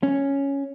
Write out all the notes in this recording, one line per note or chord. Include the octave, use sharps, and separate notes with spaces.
C#4